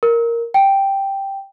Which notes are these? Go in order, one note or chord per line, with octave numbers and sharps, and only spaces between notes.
A#4
G5